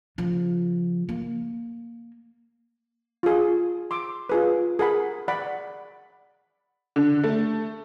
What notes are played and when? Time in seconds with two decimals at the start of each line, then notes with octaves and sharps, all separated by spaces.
0.18 C#3 F3
1.09 A#3
3.23 F4 G#4
3.91 C6 D6 E6
4.29 F4 G#4 B4
4.79 G#4 A#4 F#5 B5
5.28 D5 F#5 B5
6.96 D3
7.24 A3